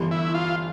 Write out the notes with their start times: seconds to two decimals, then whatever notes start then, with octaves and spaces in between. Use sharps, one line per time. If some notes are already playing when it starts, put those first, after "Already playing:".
Already playing: G1 G2 E3 G3
0.11 E4
0.34 F4